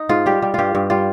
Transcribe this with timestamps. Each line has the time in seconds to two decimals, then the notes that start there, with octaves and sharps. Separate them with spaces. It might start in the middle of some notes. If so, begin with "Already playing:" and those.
Already playing: D#4
0.09 G#2 F4
0.26 G3 G4
0.42 G3
0.54 G2 F4 G4
0.75 G2
0.90 G3 F4